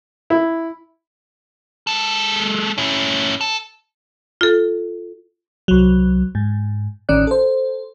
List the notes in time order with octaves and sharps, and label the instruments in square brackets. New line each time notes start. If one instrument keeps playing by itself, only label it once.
[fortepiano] E4
[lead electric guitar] G#3 A4
C#4 E4
A4
[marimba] F4 A4
[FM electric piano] C2 F#3
G#2
A1 D#3 C#4 D5 F#6
A4 C5